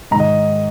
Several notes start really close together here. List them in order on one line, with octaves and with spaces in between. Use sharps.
G#2 A#5 D#3 D#5